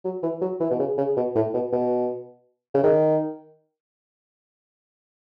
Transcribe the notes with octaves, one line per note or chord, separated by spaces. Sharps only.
F#3
E3
F#3
E3
B2
C#3
C#3
B2
A2
B2
B2
C#3
D#3